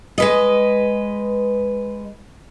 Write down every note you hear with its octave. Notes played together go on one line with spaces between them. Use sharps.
G#3 B4 D#5